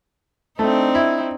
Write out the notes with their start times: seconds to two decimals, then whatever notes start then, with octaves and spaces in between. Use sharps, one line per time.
0.59 A3 C4 D4 D#4
0.95 E4